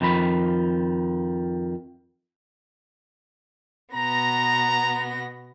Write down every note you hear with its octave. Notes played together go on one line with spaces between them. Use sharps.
F2 D#3 F3 A#5 B5
B2 B3 A#5 A#6